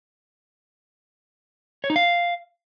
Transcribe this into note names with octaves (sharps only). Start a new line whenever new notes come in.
C#5
D#4
F5